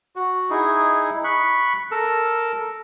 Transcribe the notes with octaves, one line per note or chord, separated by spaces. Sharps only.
F#4
D#4 E4 G#4
B5 C#6 F#6
A4 A#4 E6